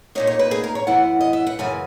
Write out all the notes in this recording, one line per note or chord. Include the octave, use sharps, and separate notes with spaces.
A#2 A#3 D#4 C#5
C#5
B4
G#4
A#4
C#5
F#2 E3 B3 E4 F#5
D#5
E5
F#5
F#2 C#3 E3 G#5